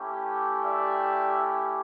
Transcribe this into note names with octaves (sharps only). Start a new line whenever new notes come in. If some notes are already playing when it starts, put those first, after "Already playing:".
Already playing: A3 C#4 E4 G4
D5 E5